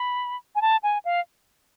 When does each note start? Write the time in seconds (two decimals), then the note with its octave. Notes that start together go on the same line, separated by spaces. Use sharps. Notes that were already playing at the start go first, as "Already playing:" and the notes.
Already playing: B5
0.55 G#5
0.62 A5
0.83 G#5
1.05 F5